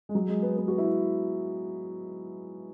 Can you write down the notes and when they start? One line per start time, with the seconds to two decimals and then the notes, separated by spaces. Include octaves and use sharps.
0.09 G#3
0.15 F#3
0.29 G#3
0.42 B3
0.57 B3
0.68 F#4
0.78 E4